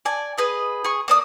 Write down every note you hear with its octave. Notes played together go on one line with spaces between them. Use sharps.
D5 G#5
G#4 B4 D#5
G#4 C#6
A#3 D5 D#6